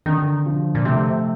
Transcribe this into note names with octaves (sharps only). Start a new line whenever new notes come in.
D3 D#3
F3
A#2
C3 A3